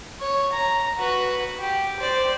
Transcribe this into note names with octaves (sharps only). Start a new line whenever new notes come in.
C#5
A#5
F#4 B4
G4
C5 D5